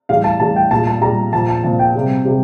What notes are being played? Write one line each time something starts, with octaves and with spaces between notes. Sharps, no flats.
A2 E3 G3 F5
A5
A2 E3 G3 A5
G5
A#2 G3 A5
A5
A#2 G3 A#5
A#2 F3 A5
A5
A#2 F3 A5
G5
C3 G3
C3 G3